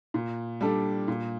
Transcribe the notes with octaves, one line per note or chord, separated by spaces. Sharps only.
A#2
G3 D4 A4
A#2